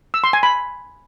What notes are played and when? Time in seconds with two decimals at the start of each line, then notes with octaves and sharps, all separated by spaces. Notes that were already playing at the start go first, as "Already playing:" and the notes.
0.14 E6
0.24 C6
0.33 G#5
0.43 B5